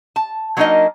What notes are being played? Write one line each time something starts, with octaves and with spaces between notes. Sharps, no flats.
A5
F#3 A#3 D4 D#4 A#4 D#5